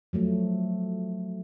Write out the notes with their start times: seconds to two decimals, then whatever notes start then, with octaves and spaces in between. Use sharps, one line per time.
0.13 F3 F#3 A3